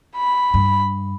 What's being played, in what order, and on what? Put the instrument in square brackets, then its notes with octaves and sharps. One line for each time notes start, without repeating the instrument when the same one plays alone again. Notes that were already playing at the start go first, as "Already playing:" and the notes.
[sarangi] B5
[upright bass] G2